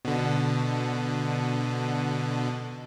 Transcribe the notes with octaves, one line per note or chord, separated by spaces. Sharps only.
B2 D3